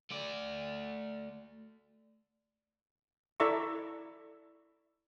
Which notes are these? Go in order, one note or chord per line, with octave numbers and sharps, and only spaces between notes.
A3 D5
E4 A4 D5 E5 A#5 C#6